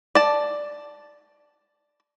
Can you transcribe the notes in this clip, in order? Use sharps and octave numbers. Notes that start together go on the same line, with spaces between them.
D5 A5